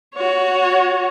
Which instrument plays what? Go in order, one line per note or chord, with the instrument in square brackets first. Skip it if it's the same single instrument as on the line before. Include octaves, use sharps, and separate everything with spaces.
[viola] F#4 C#5